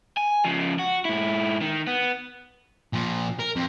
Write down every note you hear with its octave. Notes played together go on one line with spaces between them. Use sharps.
G#5
C#3 F3
F#4
G#2 E4
D#3
B3
A#2 F3
A#4
F2